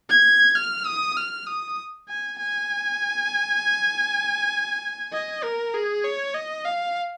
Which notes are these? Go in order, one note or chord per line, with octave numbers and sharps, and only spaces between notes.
G#6
F6
D#6
F6
D#6
G#5
G#5
D#5
A#4
G#4
C#5
D#5
F5